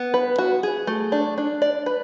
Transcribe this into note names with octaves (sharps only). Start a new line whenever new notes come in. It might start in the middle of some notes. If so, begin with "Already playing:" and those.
Already playing: B3
B4
F#4
G#4
A3
D4
D4
D5
B4